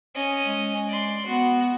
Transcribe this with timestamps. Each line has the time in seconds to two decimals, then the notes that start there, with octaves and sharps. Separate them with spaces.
0.15 C#4 D#5
0.45 G#3
0.89 D5 C6
1.26 B3 F#4